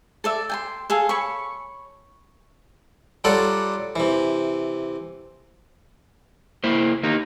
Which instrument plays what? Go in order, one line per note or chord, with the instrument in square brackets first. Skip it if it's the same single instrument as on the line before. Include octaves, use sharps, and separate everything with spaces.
[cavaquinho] A4 D5 E5
G5 G#5 C6
G#4 A4 F5
C#5 B5 C#6
[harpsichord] F#3 G3 F4 A4 D5 F#5
C3 E3
[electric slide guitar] A#3 E4 C5
A#3 D#4 G4